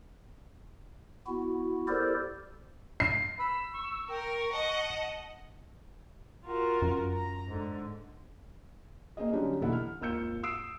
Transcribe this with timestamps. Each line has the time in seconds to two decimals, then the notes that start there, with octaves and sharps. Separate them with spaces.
1.27 B3 E4 F#4
1.88 E4 G4 A4 A#4 C5 D5
3.00 C7
3.39 B5 E6
3.74 C#6
4.09 A#4 G5
4.53 D#5 F#5 A5
6.44 F4 F#4 A#4
6.82 F#2
7.13 A#5
7.47 G#2 D3
9.17 A#3 C4 G#4 D#5
9.33 D3 F#3 G3 C#4 D#4 G4
9.61 B1 E3 A#3 E4 A4 F#5
9.73 F6
10.01 G#1 D#2 F4 E6 G6 C#7
10.43 D#6 E6 C7 D7